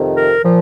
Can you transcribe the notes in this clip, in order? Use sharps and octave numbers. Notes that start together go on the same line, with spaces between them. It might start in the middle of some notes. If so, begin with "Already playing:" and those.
Already playing: F2 C3 D#3
A#4
A#2 F3